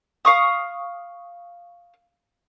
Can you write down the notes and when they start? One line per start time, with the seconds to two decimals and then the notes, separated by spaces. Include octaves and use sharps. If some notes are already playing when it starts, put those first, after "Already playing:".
0.25 F5 C#6 D#6